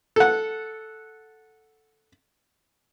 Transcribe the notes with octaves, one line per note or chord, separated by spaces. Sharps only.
A4 F#5